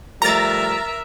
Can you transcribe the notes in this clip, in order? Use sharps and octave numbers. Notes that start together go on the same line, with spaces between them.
F3 G3 A3 A#4 E5 A#5 A6